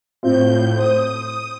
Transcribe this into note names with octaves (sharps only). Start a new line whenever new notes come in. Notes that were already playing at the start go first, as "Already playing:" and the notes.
A2 C4 F4 G6
C5 D#6